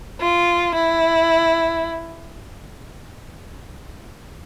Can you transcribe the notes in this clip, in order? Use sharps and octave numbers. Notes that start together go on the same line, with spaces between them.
F4
E4